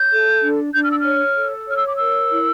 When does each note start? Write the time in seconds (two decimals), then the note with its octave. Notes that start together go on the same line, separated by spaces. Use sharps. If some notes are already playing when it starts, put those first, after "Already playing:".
Already playing: C#5 G6
0.12 A4
0.42 D4
0.73 D4 G6
0.82 F6
0.90 E6
0.98 F6
1.05 C#5
1.37 A4
1.67 C#5 F6
1.77 E6
1.86 D6
1.96 A#4 E6
2.30 E4